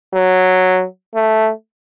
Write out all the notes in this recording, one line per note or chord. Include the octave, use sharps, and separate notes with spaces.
F#3
A3